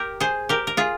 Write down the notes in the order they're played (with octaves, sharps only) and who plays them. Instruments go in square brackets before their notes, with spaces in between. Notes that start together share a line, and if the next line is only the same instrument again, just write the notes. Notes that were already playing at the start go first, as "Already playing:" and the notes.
Already playing: [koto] G4 A#4
G#4 C5
G4 A#4
A#4
F4 G#4